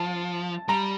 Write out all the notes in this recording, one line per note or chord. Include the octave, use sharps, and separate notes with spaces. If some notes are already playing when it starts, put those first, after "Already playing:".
Already playing: F3 A5
G3 A#5